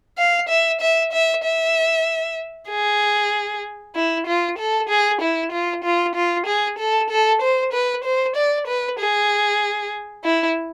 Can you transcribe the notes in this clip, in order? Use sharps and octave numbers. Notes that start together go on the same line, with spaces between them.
F5
E5
E5
E5
E5
G#4
E4
F4
A4
G#4
E4
F4
F4
F4
G#4
A4
A4
C5
B4
C5
D5
B4
G#4
E4